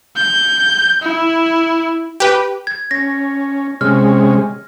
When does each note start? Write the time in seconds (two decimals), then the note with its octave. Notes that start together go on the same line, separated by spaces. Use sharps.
0.16 G6
1.02 E4
2.20 G4 B4
2.67 G#6
2.91 C#4 A#6
3.81 C3 G#3 C#4 F6